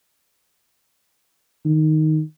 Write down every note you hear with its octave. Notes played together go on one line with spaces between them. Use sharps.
D#3